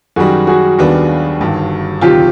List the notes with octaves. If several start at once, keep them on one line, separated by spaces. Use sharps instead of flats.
F#2 D#3 G3 F#4 G#4
F#4 G#4
D#2 D#3 G3 B3 D4
G1 G2 D#3
D2 C3 D#3 F#3 F4 G4